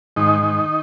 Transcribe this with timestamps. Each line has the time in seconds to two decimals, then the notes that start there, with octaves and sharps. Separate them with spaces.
0.16 G#2 D#3 D#4
0.43 D#3